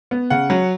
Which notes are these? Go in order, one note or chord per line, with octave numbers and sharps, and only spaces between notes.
B3
C#3 F#5
F#3